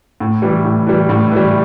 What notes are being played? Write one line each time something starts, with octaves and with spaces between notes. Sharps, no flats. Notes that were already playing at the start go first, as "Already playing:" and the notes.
A2
E3 G3
A2
E3 G3
A2
E3 G3